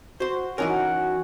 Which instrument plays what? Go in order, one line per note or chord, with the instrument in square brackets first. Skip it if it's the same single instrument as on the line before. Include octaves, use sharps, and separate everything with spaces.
[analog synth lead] F#4 [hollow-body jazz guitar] C5 C6
[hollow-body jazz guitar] E3 D#4 A#4 [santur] F#3 C#4 [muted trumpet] F#5